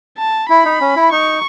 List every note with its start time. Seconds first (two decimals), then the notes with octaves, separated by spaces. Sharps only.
0.18 A5
0.50 E4 B5
0.65 D#4
0.81 C#4
0.96 E4
1.12 D#4 C#6